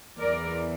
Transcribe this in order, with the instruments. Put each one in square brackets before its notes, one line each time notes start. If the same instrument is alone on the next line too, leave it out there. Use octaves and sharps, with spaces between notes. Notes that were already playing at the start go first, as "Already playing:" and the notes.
[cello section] E2 E3 A#4 D5